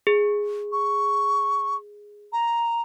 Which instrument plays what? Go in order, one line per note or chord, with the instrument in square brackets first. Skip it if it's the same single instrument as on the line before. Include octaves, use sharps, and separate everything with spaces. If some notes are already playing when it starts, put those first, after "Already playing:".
[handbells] G#4
[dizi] C#6
A#5